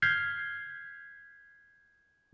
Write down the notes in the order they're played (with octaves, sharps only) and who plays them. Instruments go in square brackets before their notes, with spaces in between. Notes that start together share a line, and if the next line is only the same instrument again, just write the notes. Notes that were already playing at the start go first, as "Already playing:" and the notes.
[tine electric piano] F6 G6 G#6 B6 C7